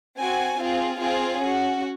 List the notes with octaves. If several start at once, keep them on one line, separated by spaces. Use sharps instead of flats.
C4 F#4 G#5
C4 F4 G#4
C4 F4 G#4
C#4 F#4